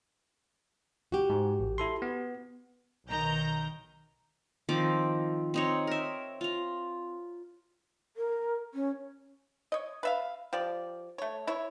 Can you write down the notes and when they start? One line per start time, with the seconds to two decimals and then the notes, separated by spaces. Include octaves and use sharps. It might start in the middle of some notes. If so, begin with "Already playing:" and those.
1.12 F#4 G4
1.30 G#2
1.59 A1
1.78 E4 A4 C6
2.02 B3
3.08 B1 D#3 A#5 G6
4.69 D#3 F3 C4 D6
5.54 C4 D#4 C#5
5.87 A#4 E5
6.41 F4 A#5
8.17 A#4
8.74 C#4
9.72 C#5 D#5
10.03 B4 E5 F5
10.53 F3 G4 D5
11.18 A3 C#5
11.47 E4 C#5